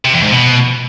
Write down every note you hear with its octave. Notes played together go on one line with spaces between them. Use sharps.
C3
E2
G#2
B2